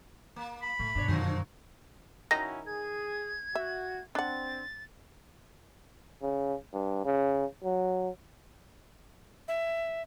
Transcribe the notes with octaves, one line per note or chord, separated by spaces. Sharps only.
A#3
B5
A2 C#3 A3
G2 B2 D4 C#5
F#2 D3 D#3 F3 F#3
D#3 C#4 D#4 E4 F#4 A#6
G#4 G#6
F#4 E5
C4 D4 F#5 A6
C#3
G2
C#3
F#3
E5